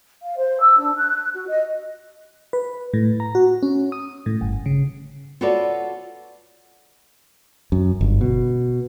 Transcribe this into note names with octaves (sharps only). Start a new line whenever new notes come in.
F5
C5
E6
D4
F#6
F#4
D#5
B4
A2
A#5
F#4
C#4
D#6
A2
G1
C#3
F4 F#4 A4 B4 C#5 D5
F#2
G1
B2